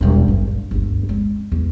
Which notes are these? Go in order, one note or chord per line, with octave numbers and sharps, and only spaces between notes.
E1 G3
G#1 G2
G2
G1 D2
G#3 C4
E2